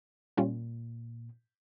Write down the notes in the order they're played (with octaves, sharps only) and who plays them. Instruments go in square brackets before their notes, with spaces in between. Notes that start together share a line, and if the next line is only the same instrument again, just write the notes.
[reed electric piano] A#2 [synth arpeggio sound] G3 C#4 F4